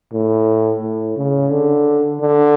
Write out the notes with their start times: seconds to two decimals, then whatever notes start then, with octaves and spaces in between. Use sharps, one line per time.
0.13 A2
0.82 A2
1.17 C#3
1.51 D3
2.20 D3